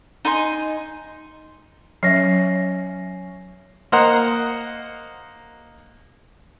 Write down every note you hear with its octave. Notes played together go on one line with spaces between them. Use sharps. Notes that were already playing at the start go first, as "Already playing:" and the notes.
D#4 D#5 G#5 C6
F#3 C#4 E5 A#6 C7
A#3 C5 D#5 F#5 A#5